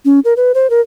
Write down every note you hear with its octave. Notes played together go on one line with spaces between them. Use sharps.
C#4
A#4
B4
C5
A#4